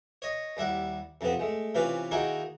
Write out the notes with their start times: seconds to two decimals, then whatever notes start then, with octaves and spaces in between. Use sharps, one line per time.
0.22 C#5 D#5
0.57 D#2 G3 E4 F#5
1.21 F2 C3 F3 B3 C4
1.39 G#3 A3
1.75 C3 E3 C#4 F4 G4 B4
2.11 D#3 A#3 D#4 E4 F#4 G#4